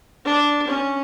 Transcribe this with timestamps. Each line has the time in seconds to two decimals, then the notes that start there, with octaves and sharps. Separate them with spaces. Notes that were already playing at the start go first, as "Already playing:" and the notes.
0.25 D4
0.68 C#4